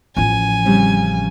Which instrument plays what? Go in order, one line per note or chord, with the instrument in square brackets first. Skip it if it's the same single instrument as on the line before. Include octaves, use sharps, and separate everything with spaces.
[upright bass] A1 F3 [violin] G#5
[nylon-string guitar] C#3 G3 C4